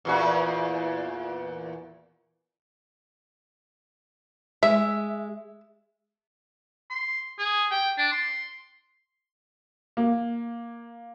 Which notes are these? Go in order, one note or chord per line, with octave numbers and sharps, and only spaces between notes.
E2 A#2 F#4
G#3 E5
C6
G#4
G5
D4
C6
A#3